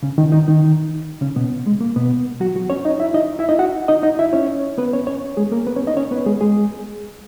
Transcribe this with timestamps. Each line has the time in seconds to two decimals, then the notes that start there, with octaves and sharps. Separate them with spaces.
0.03 C#3 C#4
0.18 D#3 D#4
0.32 D#3 D#4
0.48 D#3 D#4
1.21 C#3 C#4
1.36 B2 B3
1.66 G#3
1.81 A#3
1.96 B2 B3
2.40 F#3 F#4
2.55 F#3 F#4
2.70 C#4 C#5
2.85 D#4 D#5
3.00 E4 E5
3.14 D#4 D#5
3.39 E4 E5
3.49 D#4 D#5
3.59 F#4 F#5
3.88 D#4 D#5
4.03 D#4 D#5
4.19 E4 E5
4.33 C#4 C#5
4.78 B3 B4
4.93 C#4 C#5
5.07 C#4 C#5
5.37 G#3 G#4
5.52 A#3 A#4
5.67 B3 B4
5.76 C#4 C#5
5.87 D#4 D#5
5.97 C#4 C#5
6.11 B3 B4
6.26 G#3 G#4
6.41 G#3 G#4